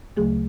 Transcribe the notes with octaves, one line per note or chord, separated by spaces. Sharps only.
D2 C#3 F#3 A3 G#4